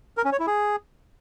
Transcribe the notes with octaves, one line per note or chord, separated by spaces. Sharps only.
A#4
C#4
C#5
E4
G#4